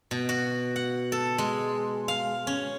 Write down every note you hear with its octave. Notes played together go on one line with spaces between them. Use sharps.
B2
F#4
F#5
A4
G#3
F5
C#4